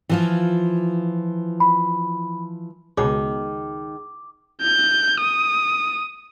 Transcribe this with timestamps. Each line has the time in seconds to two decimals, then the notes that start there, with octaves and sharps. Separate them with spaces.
0.09 E3 F3 F4
1.60 B5
2.97 C#2 B2 D#3 G#4 D6
4.62 G6
5.20 D#6